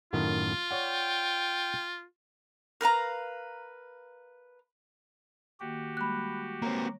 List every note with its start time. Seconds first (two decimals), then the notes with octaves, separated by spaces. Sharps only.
0.13 F#2 A2 D#3 F4
0.71 C#5 D5 F#5 G5
2.81 A#4 B4 F5 A#5
5.60 D#3 A#3 F#4 G4 G5
5.97 G3 G#3 A#3 B5 F#6
6.62 A#3 C4 C#5 A#5